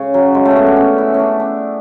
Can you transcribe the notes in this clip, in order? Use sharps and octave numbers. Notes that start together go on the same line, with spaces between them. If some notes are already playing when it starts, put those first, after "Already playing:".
Already playing: C#3
F#3
G#3
A3
C#4
B3
D4
C#4
E4
C#4
D4
D4